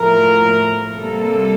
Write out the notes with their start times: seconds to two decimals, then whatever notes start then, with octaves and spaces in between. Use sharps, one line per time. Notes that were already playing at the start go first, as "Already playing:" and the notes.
Already playing: A2 F3 A3 A#4
0.92 C3 G3 A#3 A4